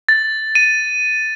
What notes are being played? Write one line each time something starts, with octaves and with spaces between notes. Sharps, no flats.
A6
D#7